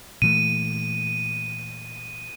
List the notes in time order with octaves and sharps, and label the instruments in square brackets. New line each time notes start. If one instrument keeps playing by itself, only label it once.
[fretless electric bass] A#2 E3 A3 [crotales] D#7